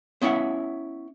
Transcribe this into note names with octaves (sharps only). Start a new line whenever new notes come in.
B3 C#4 E4 E5 F#5